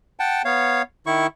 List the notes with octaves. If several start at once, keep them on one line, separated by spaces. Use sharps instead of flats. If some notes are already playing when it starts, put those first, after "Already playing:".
F#5 G5 A5
B3 C#5 F5
D#3 E4 C#6